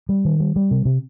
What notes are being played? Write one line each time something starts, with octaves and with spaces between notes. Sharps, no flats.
G3
D#3
G3
G3
C3
C3